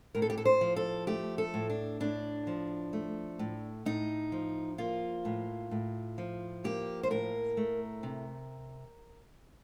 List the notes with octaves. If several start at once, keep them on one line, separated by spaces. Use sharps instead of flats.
A2 A#4
A4
G4
A4
C5
F3
A4
A3 G4
A4
A2
D4
A2 D4
F3
A3
A2
A2 D#4
F3
A#3 F4
A2
A2
F3
A#3 G4
C5
A2 A#4
A3
C3